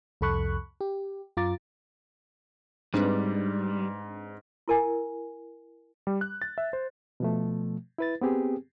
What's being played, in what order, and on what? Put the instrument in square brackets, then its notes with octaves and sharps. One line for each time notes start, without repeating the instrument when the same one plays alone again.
[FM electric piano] C2 F2 A4 B5 C#6 F#6
G4
F#2 F4 A#5 D6 A6
[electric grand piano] G#2 [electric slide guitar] G3 [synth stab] C4 D4 B4
[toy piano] E4 A#4 G#5
[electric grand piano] G3
F#6
A6
E5
C5
[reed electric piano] B2 F3 A3
E4 B4 A6
B3 C4 G4 G#4